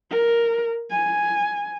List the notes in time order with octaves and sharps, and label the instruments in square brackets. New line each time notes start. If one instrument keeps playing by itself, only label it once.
[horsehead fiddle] A#4
G#5